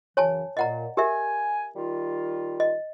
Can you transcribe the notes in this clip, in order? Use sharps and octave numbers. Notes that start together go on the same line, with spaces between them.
F#2 C#3 E3 C#5 G#5 A5
A#2 D#5 F#5 A#5
G4 A#4 E5 G#5
D#3 G3 F4
D#5